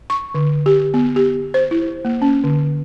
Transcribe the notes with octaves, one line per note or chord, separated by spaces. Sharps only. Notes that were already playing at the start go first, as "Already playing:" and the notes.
C#6
D3
G4
B3
G4
C5
E4
A#3
C#4
D3